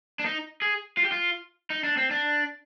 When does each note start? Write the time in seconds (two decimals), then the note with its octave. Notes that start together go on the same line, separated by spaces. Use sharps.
0.19 D4
0.25 D#4
0.62 G#4
0.97 F4
1.05 G4
1.12 F4
1.70 D#4
1.84 D4
1.97 C4
2.11 D4